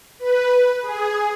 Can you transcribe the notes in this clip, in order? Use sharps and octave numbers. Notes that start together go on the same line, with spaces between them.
B4
G#4